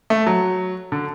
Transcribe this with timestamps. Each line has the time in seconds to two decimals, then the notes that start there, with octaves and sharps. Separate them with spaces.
0.10 A3
0.26 F#3
0.92 D3